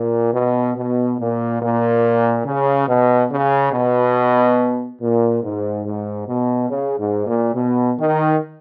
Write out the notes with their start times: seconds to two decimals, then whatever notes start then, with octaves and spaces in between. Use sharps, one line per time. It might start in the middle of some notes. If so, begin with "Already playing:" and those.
Already playing: A#2
0.33 B2
0.75 B2
1.19 A#2
1.61 A#2
2.45 C#3
2.88 B2
3.31 C#3
3.73 B2
5.01 A#2
5.43 G#2
5.85 G#2
6.27 B2
6.70 C#3
6.98 G#2
7.26 A#2
7.55 B2
7.98 D#3